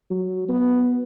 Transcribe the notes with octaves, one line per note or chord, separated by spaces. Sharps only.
F#3
B3